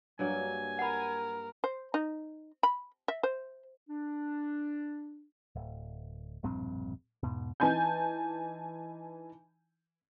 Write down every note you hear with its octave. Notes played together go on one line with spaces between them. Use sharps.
G2 F#3 A#3 G#5
A#4 F#5 B5
C5
D#4
B5
E5
C5
D4
D1
E1 A#1 G2 C4
E2 G#2 B2
E3 D#4 G#5 A5 G6